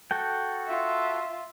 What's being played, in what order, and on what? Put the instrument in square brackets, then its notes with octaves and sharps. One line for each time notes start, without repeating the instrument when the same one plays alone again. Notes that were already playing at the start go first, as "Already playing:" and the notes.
[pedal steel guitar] F#4 A4 G5
[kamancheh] F4 E5